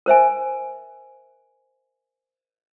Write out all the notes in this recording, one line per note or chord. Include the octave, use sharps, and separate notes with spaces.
A#4 C5 E5 G#5